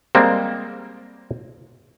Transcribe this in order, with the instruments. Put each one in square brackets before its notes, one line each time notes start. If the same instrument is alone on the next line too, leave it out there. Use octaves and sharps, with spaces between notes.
[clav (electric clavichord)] G3 G#3 A#3 C4